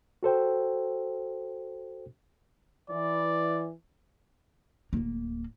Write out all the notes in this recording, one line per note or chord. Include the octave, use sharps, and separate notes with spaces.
F#4 A4 C5 G5
E3 D5
D1 A#3